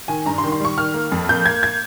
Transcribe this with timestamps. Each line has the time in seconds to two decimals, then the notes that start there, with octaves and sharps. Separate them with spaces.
0.08 D#3 G#5
0.26 G2 A#5
0.38 C6
0.44 D#3
0.52 C6
0.60 G3 C#6
0.77 D#3 F6
0.94 A#3
1.12 F2
1.29 A#3 G6
1.46 A#3 G#6
1.63 G#6